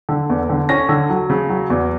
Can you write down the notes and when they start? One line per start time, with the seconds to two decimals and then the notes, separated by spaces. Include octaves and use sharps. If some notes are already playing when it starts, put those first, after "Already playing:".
0.09 D3
0.29 E2
0.49 D3
0.69 C#4 A#6
0.89 D3
1.10 F#3
1.30 C#3
1.49 F#3
1.70 E2